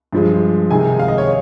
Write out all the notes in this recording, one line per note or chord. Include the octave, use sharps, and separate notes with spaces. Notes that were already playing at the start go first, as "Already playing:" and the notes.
G2 F3 G#3
C3 D#3 G#3 G#5
F5
D#5
C#5